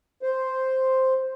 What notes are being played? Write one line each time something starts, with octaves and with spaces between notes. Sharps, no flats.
C5